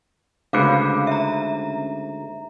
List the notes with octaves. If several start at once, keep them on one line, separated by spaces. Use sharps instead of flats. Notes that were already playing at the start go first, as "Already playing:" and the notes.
D2 G#2 C#3 C#4 B4 F5 D6
E5 A#5